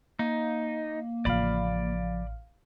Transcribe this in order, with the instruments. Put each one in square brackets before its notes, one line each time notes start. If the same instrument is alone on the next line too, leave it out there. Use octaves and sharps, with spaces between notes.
[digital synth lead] A#3 [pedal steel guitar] D#4
[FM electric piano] A1 F5 [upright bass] C#3 F3 [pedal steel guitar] D5 B5